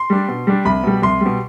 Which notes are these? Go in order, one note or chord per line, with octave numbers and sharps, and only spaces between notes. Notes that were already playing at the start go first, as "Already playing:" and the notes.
Already playing: C6
G3 D4
B2
G3 D4
C2 B5
B2 G3
C2 C6
B2 G3